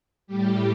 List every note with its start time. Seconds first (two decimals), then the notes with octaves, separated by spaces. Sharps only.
0.27 A2 G3 G4